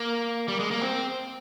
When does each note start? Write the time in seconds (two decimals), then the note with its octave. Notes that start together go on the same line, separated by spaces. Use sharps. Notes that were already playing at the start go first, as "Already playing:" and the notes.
Already playing: A#3
0.48 G3
0.60 G#3
0.71 A#3
0.82 C4